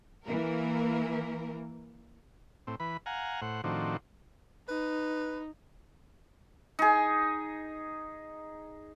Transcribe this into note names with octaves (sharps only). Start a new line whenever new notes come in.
E3 A#3 A#4
A2 C4
E3 B4 B5
F5 F#5 G#5 A#5
A2 C5 F#5
A2 D#3 F3 C4 D4 F#4
D#4 B4
D#4 G#4